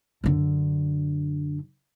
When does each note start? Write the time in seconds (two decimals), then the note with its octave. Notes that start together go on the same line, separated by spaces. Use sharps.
0.24 F#2 D3